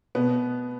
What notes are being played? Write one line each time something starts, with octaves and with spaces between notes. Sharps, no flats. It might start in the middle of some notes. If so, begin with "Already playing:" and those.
B2 B3